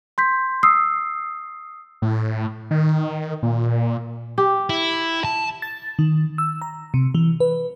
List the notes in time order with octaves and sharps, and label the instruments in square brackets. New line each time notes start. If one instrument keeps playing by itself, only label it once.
[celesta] C6 G6 B6
D#6 E6 C7
[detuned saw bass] A2
D#3
A#2
[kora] G4
[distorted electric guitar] E4
A5
[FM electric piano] A6
D#3
E6
A#5
C3
E3
B4